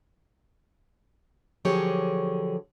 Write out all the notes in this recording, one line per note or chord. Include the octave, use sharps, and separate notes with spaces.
D3 F3 F#3 G4 G#4 C#5